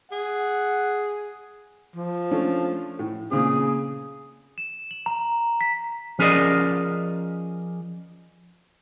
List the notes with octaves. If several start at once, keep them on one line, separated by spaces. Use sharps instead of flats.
G#4 F#5
F3
A3 C#4 D4
A2
A#2 C#3 C4 G#4
E7
F#7
A#5
B6
F3 C#4 G#4 A#4 D5 D#5